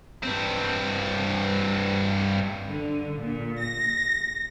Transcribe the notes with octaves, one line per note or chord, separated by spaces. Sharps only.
G2 C4
D3
A#2
A#6